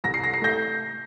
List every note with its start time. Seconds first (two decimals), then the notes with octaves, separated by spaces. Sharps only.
0.04 C2 A#6
0.14 C7
0.24 A#6
0.33 C7
0.42 A3 G6 A#6